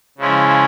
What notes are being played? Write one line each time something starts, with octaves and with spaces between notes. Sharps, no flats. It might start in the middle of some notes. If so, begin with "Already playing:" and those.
C#3 F3 G#3 C#4 E4